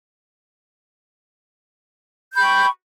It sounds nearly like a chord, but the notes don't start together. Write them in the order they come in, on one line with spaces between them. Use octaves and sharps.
G6 B5 G5 C#6